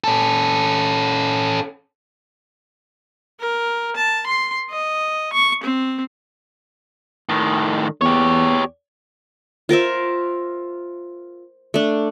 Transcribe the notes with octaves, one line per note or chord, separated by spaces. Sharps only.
C#4 A4
A#4
A5
C6
D#5
C#6
C4
A2 D#3
E2 G4 C#5
F4 A#4 C5 E5
A3 D4